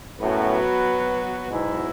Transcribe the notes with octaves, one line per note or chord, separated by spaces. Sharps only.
F#2 A2 F#3 B3 F#4 B4
G#2 B2 F#3 B3 E4